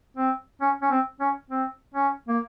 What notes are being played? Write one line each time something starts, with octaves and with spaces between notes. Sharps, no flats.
C4
C#4
C#4
C4
C#4
C4
C#4
A#3